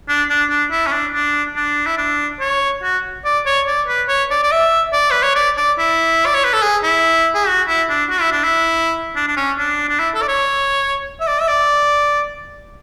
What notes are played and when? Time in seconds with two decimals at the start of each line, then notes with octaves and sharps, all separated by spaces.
0.09 D4
0.30 D4
0.50 D4
0.71 E4
0.87 C#4
0.92 D4
1.14 D4
1.56 D4
1.86 E4
1.98 D4
2.40 C#5
2.83 F#4
3.25 D5
3.46 C#5
3.67 D5
3.88 B4
4.09 C#5
4.31 D5
4.43 D5
4.52 E5
4.93 D5
5.11 B4
5.23 C#5
5.35 D5
5.57 D5
5.78 E4
6.26 D5
6.34 C#5
6.44 B4
6.53 A4
6.62 G#4
6.83 E4
7.35 G#4
7.47 F#4
7.68 E4
7.90 D4
8.10 F#4
8.21 E4
8.32 D4
8.44 E4
9.16 D4
9.27 D4
9.37 C#4
9.58 D4
9.89 D4
10.00 E4
10.15 A4
10.22 D5
10.28 C#5
11.21 E5
11.27 D5
11.41 E5
11.48 D5